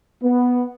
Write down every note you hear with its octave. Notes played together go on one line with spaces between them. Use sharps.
B3